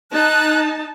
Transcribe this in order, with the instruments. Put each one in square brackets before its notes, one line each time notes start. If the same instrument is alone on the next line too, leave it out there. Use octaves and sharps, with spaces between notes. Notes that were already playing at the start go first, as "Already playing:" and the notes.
[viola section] D#4 A5 [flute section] F#6